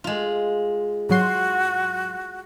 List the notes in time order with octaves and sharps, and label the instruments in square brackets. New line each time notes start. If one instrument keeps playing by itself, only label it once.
[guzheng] G#3 F4
[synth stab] G#2 F#3 C6 [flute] F#4